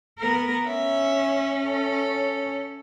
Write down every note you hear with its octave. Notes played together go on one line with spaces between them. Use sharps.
B3 A#4
C#4 E5
A4